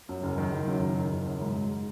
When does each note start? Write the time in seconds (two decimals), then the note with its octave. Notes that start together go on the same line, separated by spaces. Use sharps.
0.09 F#2
0.23 F#1
0.38 D#3
0.52 F#1
0.68 F#2
0.82 F#1
0.96 D#3
1.11 F#1
1.26 F#2
1.41 G#2
1.56 G#3